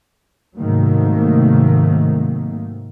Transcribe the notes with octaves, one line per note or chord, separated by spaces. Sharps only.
G#2 C3 D#3 F#3 A3 A#3